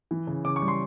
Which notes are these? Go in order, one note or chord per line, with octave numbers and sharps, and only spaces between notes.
E3
C#3
C#3 D6
C#6
G3
C6